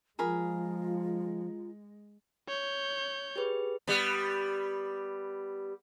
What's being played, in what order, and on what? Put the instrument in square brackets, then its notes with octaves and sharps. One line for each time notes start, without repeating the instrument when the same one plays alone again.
[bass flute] F3 [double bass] G#3 [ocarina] F4 [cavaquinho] G#4 A#4 B5
[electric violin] C#5 G6
[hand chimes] G4 G#4 B4
[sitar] G3 B3